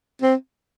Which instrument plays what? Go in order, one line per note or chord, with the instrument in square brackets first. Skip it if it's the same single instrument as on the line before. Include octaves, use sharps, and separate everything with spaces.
[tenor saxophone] C4